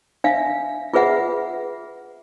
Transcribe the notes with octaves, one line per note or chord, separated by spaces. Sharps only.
D4 E5 F5
F4 G#4 B4 E5 F#5